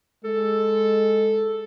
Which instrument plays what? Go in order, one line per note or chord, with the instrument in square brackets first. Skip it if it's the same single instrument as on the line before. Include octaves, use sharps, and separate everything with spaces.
[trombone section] G#3 [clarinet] A4